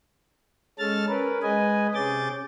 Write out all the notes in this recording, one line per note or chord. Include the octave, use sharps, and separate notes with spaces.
G#3 C#4 A4 A5 F6 A6
C#4 A#4 B4
G#3 B4 D#5 G#5
C3 C#4 G#4 D6 G6 A6